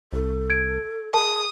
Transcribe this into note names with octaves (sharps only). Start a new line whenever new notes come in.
C2 A4
G#6 D7
G#4 A#4 A5 D#6